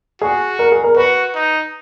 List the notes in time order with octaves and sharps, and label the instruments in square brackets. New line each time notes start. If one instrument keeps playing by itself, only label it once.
[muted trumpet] F#4 [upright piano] G#4
[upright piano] A#4
G#4
A#4
[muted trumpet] F#4 [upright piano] B4
[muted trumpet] D#4